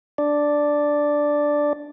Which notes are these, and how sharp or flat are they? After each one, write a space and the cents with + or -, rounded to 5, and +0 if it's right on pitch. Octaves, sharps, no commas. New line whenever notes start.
D4 +0 D5 +0